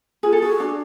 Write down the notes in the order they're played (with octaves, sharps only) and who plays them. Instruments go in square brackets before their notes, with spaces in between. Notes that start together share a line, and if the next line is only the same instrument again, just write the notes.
[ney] F4 [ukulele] G#4
[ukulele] A4
[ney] F4
[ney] F#4 [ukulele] G#4
[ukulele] D4